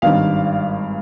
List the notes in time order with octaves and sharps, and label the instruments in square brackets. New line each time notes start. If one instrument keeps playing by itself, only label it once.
[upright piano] G#1 G2 D#3 F5